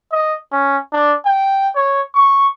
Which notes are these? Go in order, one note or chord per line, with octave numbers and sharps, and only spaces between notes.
D#5
C#4
D4
G5
C#5
C#6